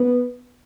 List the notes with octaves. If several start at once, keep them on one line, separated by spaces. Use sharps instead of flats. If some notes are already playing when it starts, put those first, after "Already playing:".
Already playing: B3